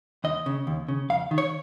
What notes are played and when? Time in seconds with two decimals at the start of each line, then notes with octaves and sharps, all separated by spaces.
0.24 D#2 D#5
0.46 C#3
0.67 D#2
0.88 C#3
1.10 F2 F5
1.31 D#3
1.38 C#5